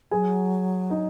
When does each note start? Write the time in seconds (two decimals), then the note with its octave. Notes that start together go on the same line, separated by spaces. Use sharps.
0.11 F#3 G#4 G#5
0.90 D#4 D#5